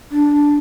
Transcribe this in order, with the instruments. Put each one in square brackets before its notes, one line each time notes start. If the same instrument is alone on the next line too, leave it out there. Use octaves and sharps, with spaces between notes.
[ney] D4